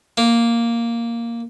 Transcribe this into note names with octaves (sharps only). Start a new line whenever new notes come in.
A#3